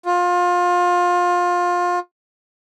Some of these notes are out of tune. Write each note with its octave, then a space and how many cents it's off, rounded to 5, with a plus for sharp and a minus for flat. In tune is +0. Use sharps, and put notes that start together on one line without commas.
F4 +25